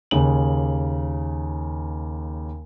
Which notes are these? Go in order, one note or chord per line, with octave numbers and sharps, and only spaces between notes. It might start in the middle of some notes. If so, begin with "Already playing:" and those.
D#2 C#3 F#7